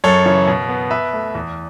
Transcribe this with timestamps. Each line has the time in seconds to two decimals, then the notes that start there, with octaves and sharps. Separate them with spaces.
0.04 F#2 A4 C#5
0.26 C#3 E3
0.47 B2
0.69 B3
0.91 B2 B4 E5
1.13 A3
1.35 E2